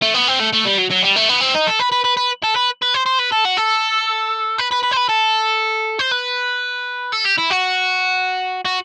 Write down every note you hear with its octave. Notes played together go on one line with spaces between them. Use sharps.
A3
B3
C4
A3
A3
G3
F#3
F#3
G3
A3
B3
C4
D#4
A4
B4
B4
B4
B4
A4
B4
B4
C5
C5
B4
A4
F#4
A4
B4
B4
B4
C5
B4
A4
C5
B4
A4
G4
E4
F#4
F#4